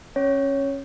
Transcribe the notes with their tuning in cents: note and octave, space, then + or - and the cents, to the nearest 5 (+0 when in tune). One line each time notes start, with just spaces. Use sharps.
C#4 -20 C#5 +0